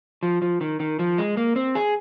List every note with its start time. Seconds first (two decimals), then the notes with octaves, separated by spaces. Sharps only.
0.23 F3
0.42 F3
0.61 D#3
0.80 D#3
0.99 F3
1.18 G#3
1.37 A#3
1.56 C4
1.75 G#4